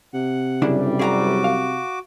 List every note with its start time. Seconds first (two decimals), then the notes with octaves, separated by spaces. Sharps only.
0.14 C3 F#5
0.62 C2 F#2 C#3 G3 D4 E4
0.99 F#4 G#4 E5 A#5 D6
1.44 F5